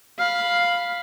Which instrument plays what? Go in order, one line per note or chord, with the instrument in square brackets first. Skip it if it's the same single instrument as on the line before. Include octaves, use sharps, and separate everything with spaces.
[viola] F5 B5